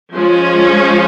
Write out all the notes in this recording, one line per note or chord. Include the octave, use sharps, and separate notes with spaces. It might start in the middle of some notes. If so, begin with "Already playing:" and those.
F3 G#3 C#4